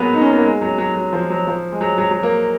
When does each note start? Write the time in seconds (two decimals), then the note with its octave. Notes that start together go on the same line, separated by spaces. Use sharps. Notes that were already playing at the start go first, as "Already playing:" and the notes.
Already playing: F#3 G#3 A#3 B3
0.14 D#4
0.21 C#4
0.30 B3
0.37 A#3
0.44 G#3
0.61 F#3
0.78 F#3
0.95 F#3
1.13 F3
1.30 F#3
1.47 F3
1.72 G#3
1.81 F#3
1.98 F#3
2.11 F#3
2.23 A#3